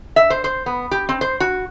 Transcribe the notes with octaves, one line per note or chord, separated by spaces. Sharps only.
E5
C5
C5
B3
G4
C4
C5
F#4